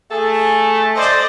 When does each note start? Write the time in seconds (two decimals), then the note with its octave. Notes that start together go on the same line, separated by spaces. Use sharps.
0.11 A3 G#4 A4 G#5
0.96 C5 D5 D#5